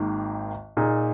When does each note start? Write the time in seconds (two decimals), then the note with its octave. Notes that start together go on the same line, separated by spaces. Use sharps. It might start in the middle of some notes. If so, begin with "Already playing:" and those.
Already playing: G#1 G#2 D#3 A#3
0.77 A#2 A#3 D#4 G#4